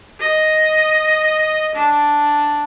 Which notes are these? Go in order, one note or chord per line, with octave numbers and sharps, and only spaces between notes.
D#5
D4